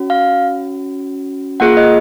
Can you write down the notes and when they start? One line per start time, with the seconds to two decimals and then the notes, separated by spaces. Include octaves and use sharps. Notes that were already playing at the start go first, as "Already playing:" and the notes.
Already playing: C#4 F#4
0.10 F5
1.60 A#3 F4 G#4 F#5
1.77 D#5